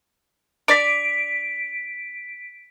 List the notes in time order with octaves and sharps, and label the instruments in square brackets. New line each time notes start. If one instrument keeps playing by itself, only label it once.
[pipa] D4 D5 [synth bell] B6 D7